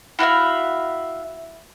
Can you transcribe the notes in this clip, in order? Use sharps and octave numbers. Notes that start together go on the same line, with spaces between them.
E4 F#4 E5 F5